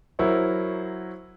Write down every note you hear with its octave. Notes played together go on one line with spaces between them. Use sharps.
F#3 E4 A#4 C5 C#5